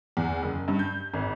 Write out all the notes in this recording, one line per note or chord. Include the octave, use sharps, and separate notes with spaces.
E2
F#1
G2
G6
G#1